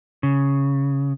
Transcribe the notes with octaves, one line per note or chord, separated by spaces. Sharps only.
C#3